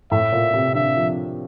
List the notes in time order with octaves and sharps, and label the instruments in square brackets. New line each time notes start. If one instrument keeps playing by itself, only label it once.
[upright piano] A2 [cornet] E5
[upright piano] A#2
C3
[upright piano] D3 [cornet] E5
[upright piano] F3